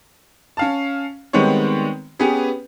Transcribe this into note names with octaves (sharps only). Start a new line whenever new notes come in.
C#4 F5 A5
D#3 G3 G#3 B3 C4 C#5
B3 C#4 G4 G#4 B4